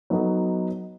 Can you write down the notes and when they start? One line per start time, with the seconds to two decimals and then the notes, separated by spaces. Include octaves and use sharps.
0.10 F#3 B3 D#4 F#4 A4